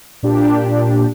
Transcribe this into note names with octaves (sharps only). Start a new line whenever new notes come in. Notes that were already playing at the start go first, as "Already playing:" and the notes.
A#2 D4 G4